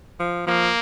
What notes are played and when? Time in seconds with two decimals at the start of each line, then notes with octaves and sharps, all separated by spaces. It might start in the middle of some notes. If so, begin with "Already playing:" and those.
0.20 F3
0.47 F3 A#3